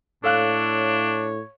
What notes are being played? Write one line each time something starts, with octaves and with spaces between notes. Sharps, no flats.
A2 D4 A4 C#5 F5 F#6